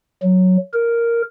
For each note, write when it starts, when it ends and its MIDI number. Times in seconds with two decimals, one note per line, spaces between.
0.23 0.57 54
0.73 1.22 70